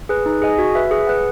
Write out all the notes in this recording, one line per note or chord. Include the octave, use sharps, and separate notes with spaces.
G#4 B4
D#4
G#4 D#5 G#5
F#4
B4 E5
G#4
B4 F#5